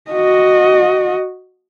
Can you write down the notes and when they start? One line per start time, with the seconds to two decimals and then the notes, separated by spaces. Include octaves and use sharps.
0.11 F#4 D#5